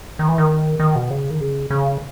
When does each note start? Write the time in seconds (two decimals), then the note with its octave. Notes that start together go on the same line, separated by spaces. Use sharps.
0.19 D#3
0.28 E3
0.38 D#3
0.80 D#3
0.96 B2
1.10 C#3
1.30 D#3
1.41 C#3
1.70 C#3